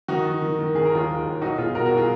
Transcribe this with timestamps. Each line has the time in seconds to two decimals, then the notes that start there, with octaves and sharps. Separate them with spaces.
0.08 D#3 D#4 F#4
0.25 D#3
0.42 D#3
0.59 D#3
0.75 D#3 G#4
0.85 A#4
0.92 D#2 F4 G#4
1.09 D#2
1.25 D#2
1.41 B1 D#4 F#4
1.58 B2 F4 G#4
1.75 B2 F#4 A#4
1.86 F#4 A#4
1.97 F4 G#4